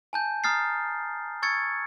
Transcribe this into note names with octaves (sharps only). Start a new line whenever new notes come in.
G#5 A5 G6
A#5 D#6 F6 A6 C7
C#6 E6 G#6 A6 C#7